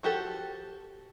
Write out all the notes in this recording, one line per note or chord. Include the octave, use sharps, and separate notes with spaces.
F3 F#4 G4 A4